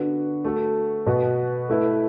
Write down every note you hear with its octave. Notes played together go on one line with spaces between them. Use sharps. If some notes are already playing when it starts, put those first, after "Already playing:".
Already playing: D3 B3 F#4 B4
A3 F#4 A4
B2 B3 F#4 B4
A3 E4 B4